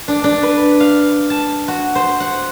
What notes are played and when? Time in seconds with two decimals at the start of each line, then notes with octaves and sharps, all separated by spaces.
0.08 D4
0.24 D4
0.43 B4
0.80 F5
1.30 A5
1.68 F#4
1.95 C5
2.20 F#5